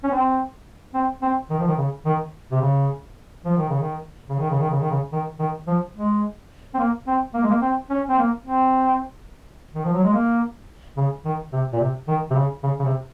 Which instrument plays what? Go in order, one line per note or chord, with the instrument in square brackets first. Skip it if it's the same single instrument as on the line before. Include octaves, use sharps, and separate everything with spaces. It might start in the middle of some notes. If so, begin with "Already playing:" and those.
[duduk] C#4
C4
C4
C4
D#3
F3
D#3
C#3
D#3
C3
C#3
F3
D#3
C#3
D#3
C#3
D#3
C#3
D#3
C#3
D#3
C#3
D#3
D#3
F3
G#3
C4
A#3
C4
A#3
G#3
A#3
C4
C#4
C4
A#3
C4
D#3
F3
F#3
G#3
A#3
C#3
D#3
C3
A#2
C3
D#3
C3
C#3
C#3
C#3
C3